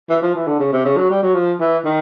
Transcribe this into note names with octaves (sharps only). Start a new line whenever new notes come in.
E3
F3
E3
D3
C#3
C3
C#3
F#3
G3
F#3
F3
E3
D#3